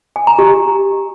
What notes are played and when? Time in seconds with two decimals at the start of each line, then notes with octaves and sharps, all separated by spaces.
0.16 G#5
0.27 A#5
0.39 G4